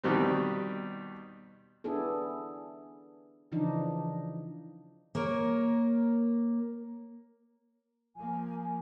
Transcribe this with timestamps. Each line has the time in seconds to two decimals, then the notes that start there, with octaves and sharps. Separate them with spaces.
0.04 B2 D#3 G3 C4
1.84 B3 D4 E4 G#4 A4
3.52 C#3 E3 F3 D4 D#4
5.15 A#3 A#4 C#5
8.16 F3 A#3 G#5